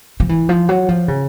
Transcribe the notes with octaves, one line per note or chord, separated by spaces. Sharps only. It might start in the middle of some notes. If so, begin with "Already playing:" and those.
F3
E3
F3
F#3
F3
C#3